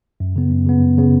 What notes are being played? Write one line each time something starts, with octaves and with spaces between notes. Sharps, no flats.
F#2
C#3 B3
F#2
C#3 B3
F#2
C#3 B3